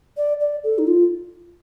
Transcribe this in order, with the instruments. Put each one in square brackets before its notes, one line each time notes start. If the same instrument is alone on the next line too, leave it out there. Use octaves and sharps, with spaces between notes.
[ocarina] D5
D5
A4
D#4
F4